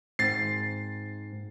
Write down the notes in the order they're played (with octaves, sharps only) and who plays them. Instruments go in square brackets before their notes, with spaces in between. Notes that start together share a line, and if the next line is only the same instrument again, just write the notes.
[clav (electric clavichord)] G#2 C4 [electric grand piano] A6 C7